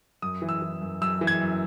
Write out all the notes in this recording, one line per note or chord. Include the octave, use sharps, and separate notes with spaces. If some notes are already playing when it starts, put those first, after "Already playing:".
F#2 D#6
E3
E6
E3
F#2
F#2 E6
E3
G#6
F#2